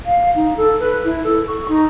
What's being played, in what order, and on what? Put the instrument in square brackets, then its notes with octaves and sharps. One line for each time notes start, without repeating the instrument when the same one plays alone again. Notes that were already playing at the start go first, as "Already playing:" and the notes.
[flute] F5
D#4
A4
B4
E4
A4
C#6
D#4